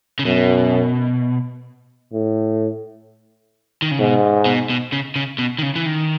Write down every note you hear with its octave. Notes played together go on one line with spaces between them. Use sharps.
C#3
F#2 B2
A2
D#3
C#3
G#2 B2
B2
B2
C#3
C#3
B2
D#3
C#3
E3
D#3